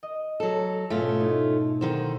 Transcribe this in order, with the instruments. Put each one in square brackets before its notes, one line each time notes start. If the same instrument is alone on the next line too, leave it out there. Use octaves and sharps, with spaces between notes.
[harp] D#5
[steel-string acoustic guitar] F#3 A4
[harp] G#2 B2 [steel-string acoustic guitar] A3 C#4 F4
[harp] D#4 E4
[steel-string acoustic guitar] D3 D#3 C5 [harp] F#3